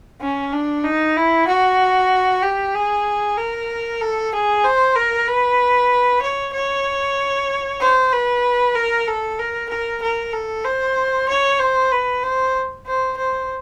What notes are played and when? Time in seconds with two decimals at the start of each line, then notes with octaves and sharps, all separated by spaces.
0.21 C#4
0.52 D4
0.84 D#4
1.17 E4
1.47 F#4
2.43 G4
2.74 G#4
3.37 A#4
4.01 A4
4.33 G#4
4.64 C5
4.95 A#4
5.27 B4
6.22 C#5
6.53 C#5
7.80 C5
8.12 B4
8.75 A#4
9.07 A4
9.39 A#4
9.69 A#4
10.02 A#4
10.33 A4
10.64 C5
11.29 C#5
11.59 C5
11.91 B4
12.23 C5
12.86 C5
13.17 C5